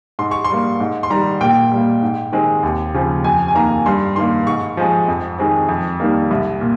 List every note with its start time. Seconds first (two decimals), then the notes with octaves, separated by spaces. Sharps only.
0.19 G#2 C6
0.31 C#6
0.44 C6
0.49 G3 A#3
0.80 G#2
1.03 C6
1.10 D#3 G3 A#5
1.41 A#2 G5
1.71 G3 A#3
2.02 G#2
2.32 D#3 G#3 C4
2.63 D#2
2.94 C#3 F3 C4
3.24 F2 G#5
3.48 G#5
3.55 D#3 A#3 A#5
3.86 G2 C6
4.16 D#3 A#3 C6
4.46 G#2 C#6
4.77 F3 G#3 C4
5.08 F2
5.38 D#3 G#3 C4
5.69 F2
6.00 D#3 G3 A#3
6.31 C2
6.61 A#2